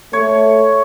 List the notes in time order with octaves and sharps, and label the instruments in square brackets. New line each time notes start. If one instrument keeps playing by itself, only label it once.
[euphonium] A3 [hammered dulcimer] C#5